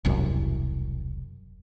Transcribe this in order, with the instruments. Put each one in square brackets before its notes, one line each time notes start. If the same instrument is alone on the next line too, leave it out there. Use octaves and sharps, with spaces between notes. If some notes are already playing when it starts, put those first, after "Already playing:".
[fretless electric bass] E1 C2 F#2